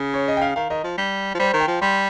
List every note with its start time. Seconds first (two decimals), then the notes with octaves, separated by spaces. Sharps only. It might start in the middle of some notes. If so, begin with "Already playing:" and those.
Already playing: C#3
0.14 C#5
0.28 D#5
0.37 G5
0.42 F5
0.56 D#3 F5
0.70 D#3 D#5
0.84 F3
0.98 G3
1.35 F3
1.39 G3 C5
1.53 D#3
1.60 G5
1.68 F3
1.81 G3 C6